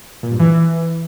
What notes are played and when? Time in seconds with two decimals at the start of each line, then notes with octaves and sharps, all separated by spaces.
0.23 A#2
0.31 G2
0.39 E3